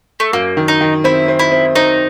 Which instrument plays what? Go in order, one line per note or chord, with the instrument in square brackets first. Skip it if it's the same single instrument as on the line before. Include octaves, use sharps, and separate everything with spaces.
[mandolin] A3
[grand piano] F#2 [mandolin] A#3
[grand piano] D#3
[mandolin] D#4
[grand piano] D#3
[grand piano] C4 [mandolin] E4
[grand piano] C4
[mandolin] E4
[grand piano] C4
[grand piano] C4 [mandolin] D#4